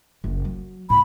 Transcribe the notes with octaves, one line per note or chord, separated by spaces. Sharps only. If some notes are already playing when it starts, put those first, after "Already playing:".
F#1
F#3
A2 B5